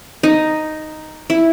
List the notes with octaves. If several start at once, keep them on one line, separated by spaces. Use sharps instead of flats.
D#4
E4